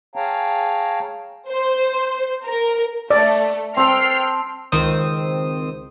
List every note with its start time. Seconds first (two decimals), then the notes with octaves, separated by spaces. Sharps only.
0.16 G#4 C#5 F5 G5 A5 A#5
1.49 C5
2.44 A#4
3.11 A3 D5
3.77 C4 A4 G5 F6 C7
4.72 C#2 D#3 C4 C5 D#6